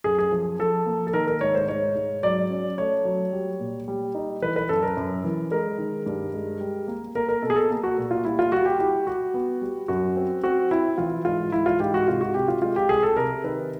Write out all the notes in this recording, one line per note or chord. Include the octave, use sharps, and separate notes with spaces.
F#2 G#4
G#4
F3
F3 A4
A#3
A4
D#3 A#4
A#4
G#2 C#5
C5
G#2 C#5
G#2
F#3 D5
C#4
A3 C#5
F#3
G3
A#2
G3
D#4
E3 B4
B4
F#2 A4
A#4
F#2
E3
G#3 A#4
D#3
G2
G#3
G3
A#3
A#3 A#4
A#4
B2 A4
G#4
A4
A#3
F#4
A#2
F4
G3 E4
F4
G3 F#4
G4
E4 G4
G3 F#4
B3
G3
F#2 F#4
C4
C4 F#4
C4 E4
E3 F4
G#2 F4
E3 E4
F4
G#2 G4
F#4
C3 F4
F#4
C3 G4
F4
G#3 F4
G4
C2 G#4
A4
C3 A#4
D#3 B4